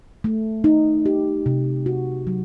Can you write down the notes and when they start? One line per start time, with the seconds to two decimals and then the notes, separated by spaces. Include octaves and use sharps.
0.24 A3
0.64 D#4
1.06 G4
1.46 C3
1.86 F#4
2.27 F#3